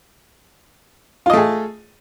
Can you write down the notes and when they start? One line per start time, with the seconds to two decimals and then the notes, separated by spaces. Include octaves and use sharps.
1.26 F4
1.30 D#5
1.33 A3
1.37 G#4